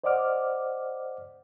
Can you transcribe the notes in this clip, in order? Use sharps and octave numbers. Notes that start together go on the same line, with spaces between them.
C5 D5 D#5 F#5 D6 F6